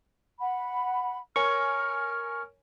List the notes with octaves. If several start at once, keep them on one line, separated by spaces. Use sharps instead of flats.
F#5 B5
A#4 C#5 G#5 C#6 F6